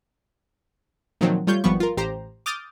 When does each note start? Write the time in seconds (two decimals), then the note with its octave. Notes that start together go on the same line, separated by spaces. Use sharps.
1.21 A#2 D#3 F3 F#3 C4
1.47 G3 A3 F4 C#5 G6
1.64 G#1 F3 G3 B3 C#6
1.80 F4 A#4
1.97 A1 G4 C5 A#5
2.46 D6 D#6 F6 G6 A6